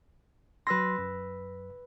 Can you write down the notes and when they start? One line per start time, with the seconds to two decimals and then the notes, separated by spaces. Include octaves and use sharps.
0.67 F#3 B4 C6 E6 A#6
0.99 F#2